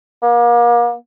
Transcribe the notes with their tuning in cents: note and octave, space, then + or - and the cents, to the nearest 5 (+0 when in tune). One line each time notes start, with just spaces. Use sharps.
A#3 +35